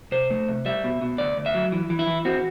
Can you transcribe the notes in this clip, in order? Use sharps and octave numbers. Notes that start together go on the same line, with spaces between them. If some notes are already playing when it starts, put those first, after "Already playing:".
C3 C5
A3
C3
G3 E5
B2
B2
D2 D5
D2
E5
F#3
E3
E3
E4
E3
C4 F#4